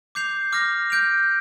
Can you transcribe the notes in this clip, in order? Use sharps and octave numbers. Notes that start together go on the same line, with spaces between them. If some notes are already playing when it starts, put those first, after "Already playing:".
D6 G6 C7 F7
D6 F6 A#6
G6 D7 F7